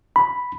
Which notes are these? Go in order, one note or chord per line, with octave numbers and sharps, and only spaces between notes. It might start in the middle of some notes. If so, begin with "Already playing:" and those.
B5